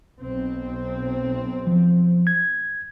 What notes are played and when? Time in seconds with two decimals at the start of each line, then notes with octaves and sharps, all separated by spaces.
0.19 B1 C4
1.67 F3
2.27 G#6